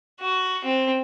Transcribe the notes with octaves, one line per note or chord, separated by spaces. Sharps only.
F#4
C4